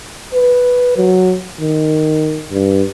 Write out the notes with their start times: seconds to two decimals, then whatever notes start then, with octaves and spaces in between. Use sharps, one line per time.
0.34 B4
0.97 F#3
1.61 D#3
2.50 G2